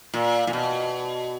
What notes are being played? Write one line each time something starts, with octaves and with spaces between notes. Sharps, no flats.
A#2
A#2
B2